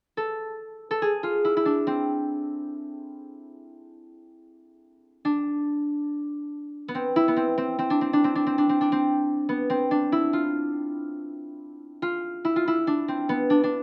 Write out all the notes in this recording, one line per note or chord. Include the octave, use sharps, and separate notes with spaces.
A4
A4
G#4
F4
E4
E4
D4
C4
D4
B3
C4
E4
B3
C4
C4
C4
D4
C4
D4
C4
D4
C4
D4
C4
D4
C4
B3
C4
D4
E4
F4
F4
E4
F4
E4
D4
C4
B3
D4
D4